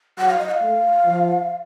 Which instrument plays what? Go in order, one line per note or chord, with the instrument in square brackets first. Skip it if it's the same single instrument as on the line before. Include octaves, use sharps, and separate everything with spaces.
[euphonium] F#3 [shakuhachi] F#5
[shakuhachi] F5
D#5
F#5
F5
[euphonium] A3
F3